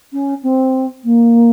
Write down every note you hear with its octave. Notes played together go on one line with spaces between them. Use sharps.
C#4
C4
A#3